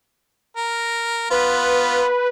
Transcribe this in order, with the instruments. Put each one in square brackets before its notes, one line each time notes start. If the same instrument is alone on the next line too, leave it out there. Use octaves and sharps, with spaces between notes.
[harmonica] A#4
[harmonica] B3 F4 [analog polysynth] B4